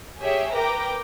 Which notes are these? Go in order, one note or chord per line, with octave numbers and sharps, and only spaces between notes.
G4 G#4 C#5 E5
A#4 B4 G5 A#5 D6